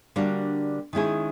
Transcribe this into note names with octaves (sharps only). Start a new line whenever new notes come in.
D3 G3 A#3 D4 F#4
D#3 G#3 C#4 E4 G#4